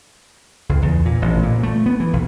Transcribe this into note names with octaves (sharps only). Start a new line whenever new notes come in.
C#2
E2
A#2
A1
A#2
A3
B3
E3
B1